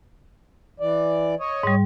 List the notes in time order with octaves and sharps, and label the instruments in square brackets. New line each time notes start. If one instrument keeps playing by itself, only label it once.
[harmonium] E3 D5
C#5 D#5
[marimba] G#2 G3